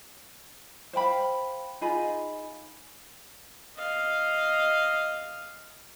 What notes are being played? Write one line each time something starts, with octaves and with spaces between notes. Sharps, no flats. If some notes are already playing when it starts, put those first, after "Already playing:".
C5 F5 G5 B5
D#4 F4 G#4 B5
D#5 F5